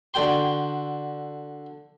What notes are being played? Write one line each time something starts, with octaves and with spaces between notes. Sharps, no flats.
D3 F#4 G5 C6